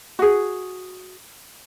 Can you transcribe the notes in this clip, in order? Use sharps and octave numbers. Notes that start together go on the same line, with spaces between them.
F#4 G#4